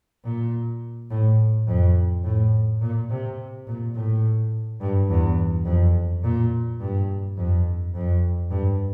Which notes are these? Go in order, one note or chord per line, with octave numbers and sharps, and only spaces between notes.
A#2
A2
F2
A2
A#2
C3
A#2
A2
G2
E2
F2
A#2
G2
F2
F2
G2